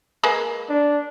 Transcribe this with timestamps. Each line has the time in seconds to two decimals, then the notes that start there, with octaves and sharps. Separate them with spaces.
0.23 G#3 A#3 B4
0.70 D4